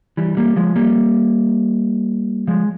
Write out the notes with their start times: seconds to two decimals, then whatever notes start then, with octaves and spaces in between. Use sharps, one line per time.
0.17 E3 G3
0.37 G3 A#3
0.56 F3 G#3
0.76 G3 A#3
2.47 F3 G#3